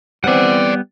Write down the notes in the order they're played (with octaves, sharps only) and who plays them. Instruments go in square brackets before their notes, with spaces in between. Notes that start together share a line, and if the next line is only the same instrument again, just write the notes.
[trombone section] E3 C4 [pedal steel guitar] G3 B3 [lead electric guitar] D5 F#5